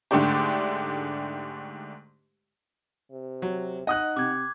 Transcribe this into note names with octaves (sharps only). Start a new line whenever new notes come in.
G#2 D3 G#3 A3 D4 G4
C3
F#3
D#4 D#5 F#5 D#6 F#6
C3 D6 G#6